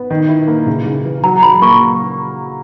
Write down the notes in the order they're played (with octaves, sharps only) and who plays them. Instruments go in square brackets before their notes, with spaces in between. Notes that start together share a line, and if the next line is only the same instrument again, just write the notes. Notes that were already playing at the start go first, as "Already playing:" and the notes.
Already playing: [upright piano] B3
D#3
E4
A#3
C#3
C#3
E3
[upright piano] F#3 [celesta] A#5
[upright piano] F#3 [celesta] B5
[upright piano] A#3 [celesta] C#6